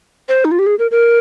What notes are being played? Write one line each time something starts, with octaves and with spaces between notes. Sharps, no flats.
C5
D#4
F4
G4
G#4
A#4
A#4